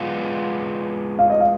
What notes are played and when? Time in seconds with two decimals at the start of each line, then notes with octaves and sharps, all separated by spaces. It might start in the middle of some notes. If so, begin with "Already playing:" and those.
Already playing: G#3 B3 F4
1.19 F5
1.30 D#5
1.40 F5